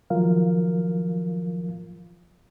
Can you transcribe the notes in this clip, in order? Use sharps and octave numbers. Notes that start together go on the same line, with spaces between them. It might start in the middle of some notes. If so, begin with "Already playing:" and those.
D#3 F3 F#3 F4 A#4 F5